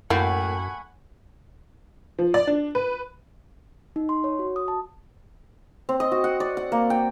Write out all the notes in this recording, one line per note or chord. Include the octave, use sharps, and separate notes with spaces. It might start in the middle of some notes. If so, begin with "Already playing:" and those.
F#2 A2 A#3 F#4 F#5 G#5 B5
F3
D5
D4
B4
D#4
C6
C#5
F#4
D#6
A5
C4
D#5
F#4
F#5
D5
F#5
A#3
G5